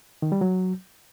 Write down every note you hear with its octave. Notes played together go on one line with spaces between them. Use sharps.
D#3
G3
F#3